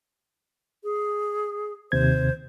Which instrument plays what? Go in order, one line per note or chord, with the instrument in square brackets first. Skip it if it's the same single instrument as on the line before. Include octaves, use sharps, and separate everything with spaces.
[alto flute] G#4
[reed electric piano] D#2 C3 G#6 [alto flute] C5